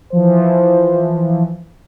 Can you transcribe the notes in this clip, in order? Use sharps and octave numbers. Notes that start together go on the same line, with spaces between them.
E3 F3 C5